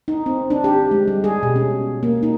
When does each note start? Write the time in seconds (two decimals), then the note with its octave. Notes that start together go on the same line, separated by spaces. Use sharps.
0.08 D#4
0.26 C4
0.50 D4
0.64 G4
0.91 G#3
1.08 G3
1.24 G#4
1.43 B2
1.56 C#4
2.03 A#3
2.23 D#4